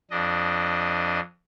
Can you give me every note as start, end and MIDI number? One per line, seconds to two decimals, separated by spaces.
0.11 1.20 41
0.11 1.20 62
0.11 1.20 75